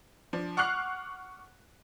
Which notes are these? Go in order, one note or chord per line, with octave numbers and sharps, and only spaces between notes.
F3 D4
F#5 C#6 D6 F6 F#6 C7